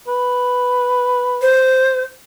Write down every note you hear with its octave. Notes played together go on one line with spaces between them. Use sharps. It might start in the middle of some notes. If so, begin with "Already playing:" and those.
B4
C5